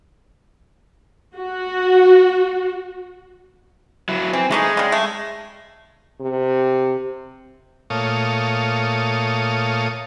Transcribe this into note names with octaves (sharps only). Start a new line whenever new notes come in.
F#4
F#3 E4
E3 C4
E3 G#3 A3 D#4
C#3 G3
A3
C3
A#2 A3 C#5 F5 D#6